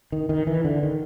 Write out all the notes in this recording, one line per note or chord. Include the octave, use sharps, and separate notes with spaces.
D#3
D#3
E3
D3
D#3